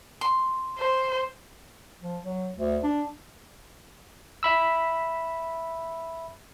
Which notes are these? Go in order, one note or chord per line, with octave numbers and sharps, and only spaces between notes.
C6
C5
F3
F#3
D2
D4
E5 B5 E6